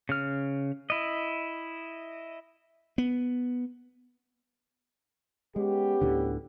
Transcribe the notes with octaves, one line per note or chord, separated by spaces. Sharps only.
C#3 F6
E4 D#5
B3
G#3 B3 C#4 G4
D2 A2 D3